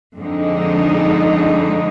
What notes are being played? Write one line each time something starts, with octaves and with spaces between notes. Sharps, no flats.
F2 D3 G#3 D#4